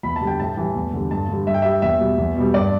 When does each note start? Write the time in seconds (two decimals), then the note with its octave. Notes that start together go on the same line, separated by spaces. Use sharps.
0.03 E2 B5
0.16 A5
0.21 D3 G3
0.27 G5
0.39 A2 A5
0.57 E3 G3
0.75 E2
0.93 D3 G3
1.11 G2 A5
1.29 D3 G3
1.47 G2 E5
1.54 G5
1.62 G3 E5
1.82 E2 E5
2.00 B2 G3
2.18 E2
2.36 B2 G3
2.54 G2 D5